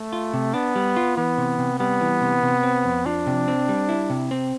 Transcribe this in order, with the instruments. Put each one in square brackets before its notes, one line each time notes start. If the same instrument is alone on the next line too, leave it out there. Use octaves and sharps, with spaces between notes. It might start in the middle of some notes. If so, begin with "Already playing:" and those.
Already playing: [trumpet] A3
[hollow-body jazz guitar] F4
C3
[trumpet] B3 [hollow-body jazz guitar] D4
[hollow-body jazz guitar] G3
F4
[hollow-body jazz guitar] E3 [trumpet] B3
[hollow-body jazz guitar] C3
C3
[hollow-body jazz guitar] G3 [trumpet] B3
[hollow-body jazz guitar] E3
C3
C3
C4
F2
[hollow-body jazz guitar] F3 [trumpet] D4
[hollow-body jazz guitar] C3
C4
G3
E4
C3
C4